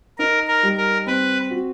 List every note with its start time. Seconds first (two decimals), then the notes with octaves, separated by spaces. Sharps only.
0.18 D#4 A#4
0.48 A#4
0.63 G3
0.77 A#4
1.06 C4 B4
1.51 F#4